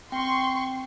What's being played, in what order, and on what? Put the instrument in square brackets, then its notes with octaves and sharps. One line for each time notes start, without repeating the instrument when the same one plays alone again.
[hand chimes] C4 G5 [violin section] C6 C#6